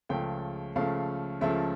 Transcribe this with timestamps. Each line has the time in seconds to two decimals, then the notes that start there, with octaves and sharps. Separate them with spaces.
0.09 C#2 C#3 F3 A3 G5
0.75 C#2 C#3 F3 A3 F5
1.41 C#2 C#3 F3 A3 E5